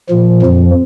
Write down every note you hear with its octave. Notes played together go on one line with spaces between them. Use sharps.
A#2 F3
F2 F3